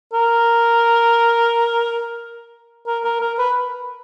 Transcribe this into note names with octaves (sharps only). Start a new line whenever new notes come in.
A#4
A#4
A#4
A#4
B4